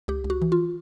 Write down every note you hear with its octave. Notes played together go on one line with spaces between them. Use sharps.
C#2 G4
C#2
F#4
E3
F4